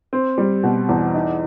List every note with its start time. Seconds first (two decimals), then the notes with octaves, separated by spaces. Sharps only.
0.13 C4
0.38 G3
0.63 B2
0.89 E2
1.14 D#4